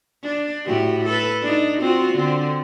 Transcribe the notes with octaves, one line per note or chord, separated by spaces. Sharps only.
D4
A2 F#4 G4
A4 B4
D4 D#4
C4 F4 F#4
D3 C4